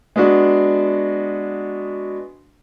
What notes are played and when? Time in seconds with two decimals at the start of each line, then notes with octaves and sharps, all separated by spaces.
0.16 G#3 B3 D4 F#4